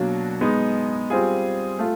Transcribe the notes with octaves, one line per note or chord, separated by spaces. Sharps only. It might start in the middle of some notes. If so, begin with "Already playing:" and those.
Already playing: B2 F#3 A#3 D4 F#4
G#3 B3 D#4
G3 C4 F4 G#4
A3 F4